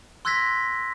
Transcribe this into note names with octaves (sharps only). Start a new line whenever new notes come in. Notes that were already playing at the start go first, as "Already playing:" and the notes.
C6 E6 F#6 G#6 A#6 B6